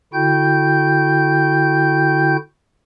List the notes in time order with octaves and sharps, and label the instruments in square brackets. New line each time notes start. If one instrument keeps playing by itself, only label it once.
[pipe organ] D3 E4 F#4 G5 G6